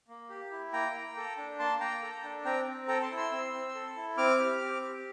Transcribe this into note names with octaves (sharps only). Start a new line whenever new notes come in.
A#3
G4
E4
A#3 G5 A#5
A#3
A4
D4
A#3 A5 C6
A#3 G5 A#5
A4
D4
C4 G5 A#5
C4
A4 G5 A#5
A5 C6
E4
C6 E6
C4
C4
A4
E4
C4 D6 F6
G4
C4
G4